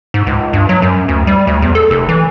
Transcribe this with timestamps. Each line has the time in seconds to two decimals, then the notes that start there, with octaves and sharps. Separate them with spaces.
0.14 G#2
0.27 C#2
0.53 G2
0.69 F#3
0.82 F#2
1.08 D2
1.27 G3
1.47 D2
1.62 E2
1.75 A4
1.91 F1
2.09 E3